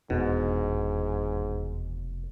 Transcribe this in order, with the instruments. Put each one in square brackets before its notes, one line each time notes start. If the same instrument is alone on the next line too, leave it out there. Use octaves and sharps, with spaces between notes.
[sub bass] F1 [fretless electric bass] E2 D4 [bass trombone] G#2 [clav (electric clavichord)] B2